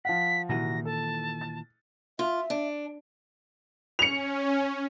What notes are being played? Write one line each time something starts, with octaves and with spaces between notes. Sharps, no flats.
F3 F5 F#5 B6
C2 A#2 D#3 E3 F#4 A#6
A4 A5
A6
F4 E5
D4
C#4 C#7 F7